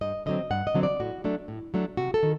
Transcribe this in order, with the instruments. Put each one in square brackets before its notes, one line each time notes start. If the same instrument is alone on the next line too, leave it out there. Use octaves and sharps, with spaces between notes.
[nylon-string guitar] G2 D#5
D3 F#3 C4 D#5
G2 F#5
D#5
D3 F#3 C4
D5
A2 F#4
F#3 A3 D4
A2
F#3 A3 D4
C3 F#4
A4
D#3